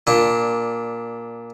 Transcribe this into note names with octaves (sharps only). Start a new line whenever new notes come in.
A#2 D4